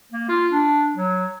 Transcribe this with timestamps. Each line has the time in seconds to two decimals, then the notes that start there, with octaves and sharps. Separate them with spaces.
0.12 A#3
0.29 F4
0.51 D4
0.96 F#3